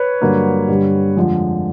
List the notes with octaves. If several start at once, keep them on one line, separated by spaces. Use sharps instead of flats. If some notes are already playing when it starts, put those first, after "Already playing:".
Already playing: B4 C#5
G2 D3 F#3 A#3 D4
G2 D3 G3
F2 D3 F3 G#3